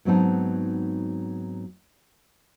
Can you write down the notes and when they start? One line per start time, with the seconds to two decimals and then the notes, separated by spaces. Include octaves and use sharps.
0.05 G#2 F#3 B3 C4 D#4 A5